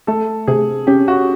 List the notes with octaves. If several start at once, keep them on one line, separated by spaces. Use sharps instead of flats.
A3 A4
C3 G#4
C#4 G4
F#4